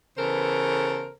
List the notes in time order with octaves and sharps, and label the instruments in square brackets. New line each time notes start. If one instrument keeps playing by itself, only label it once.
[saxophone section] C#3 E3 B3 A4 A#4 C5